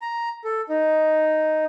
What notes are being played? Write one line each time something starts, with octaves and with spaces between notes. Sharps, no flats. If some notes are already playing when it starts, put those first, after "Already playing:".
A#5
A4
D#4